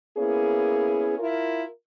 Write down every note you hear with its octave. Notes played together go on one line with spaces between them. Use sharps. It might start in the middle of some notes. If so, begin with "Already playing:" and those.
A#3 B3 C#4 E4 G#4
E4 F4 A#4